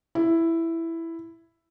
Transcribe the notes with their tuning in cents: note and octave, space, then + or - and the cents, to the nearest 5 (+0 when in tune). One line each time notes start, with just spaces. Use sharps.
E4 +5